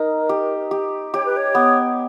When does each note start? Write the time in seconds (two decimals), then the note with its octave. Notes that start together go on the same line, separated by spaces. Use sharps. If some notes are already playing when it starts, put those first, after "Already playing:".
Already playing: D#4 A#4
0.29 G4
0.71 G4
1.14 G4 C#5
1.25 B4
1.36 C#5
1.55 B3